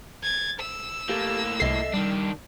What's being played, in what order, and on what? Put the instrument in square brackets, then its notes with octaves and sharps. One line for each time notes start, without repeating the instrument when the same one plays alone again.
[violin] G#6 A6
E6
[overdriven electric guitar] A2 A#3 [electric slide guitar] G4 A4
[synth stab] C2 C7 [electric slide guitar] A4 D#5 E5
[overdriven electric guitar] D#3 D4 [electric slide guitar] G3